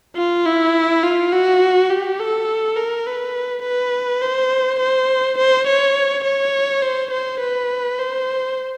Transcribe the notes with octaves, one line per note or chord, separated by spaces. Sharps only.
F4
E4
F4
F#4
G4
A4
A#4
B4
B4
C5
C5
C5
C#5
C#5
C5
C5
B4
C5